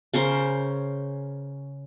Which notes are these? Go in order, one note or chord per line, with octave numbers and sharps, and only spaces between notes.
C#3 C#4 A#4 C5